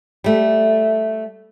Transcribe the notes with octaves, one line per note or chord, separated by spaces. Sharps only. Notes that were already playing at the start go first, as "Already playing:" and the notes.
G3 A3